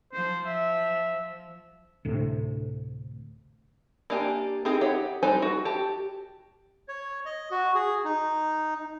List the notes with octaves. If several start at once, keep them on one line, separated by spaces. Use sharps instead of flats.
F3 C5
E5
D2 A2 C3
A#3 D4 G4 G#5
C4 D#4 G4 G#4
G4 C#5 F#5
G3 D#4 B4 C5 G#5
F#4
G4 A5
C#5
D#5
F#4
G#4
D#4